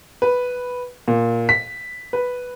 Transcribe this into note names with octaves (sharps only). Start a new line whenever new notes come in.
B4
A#2
B6
B4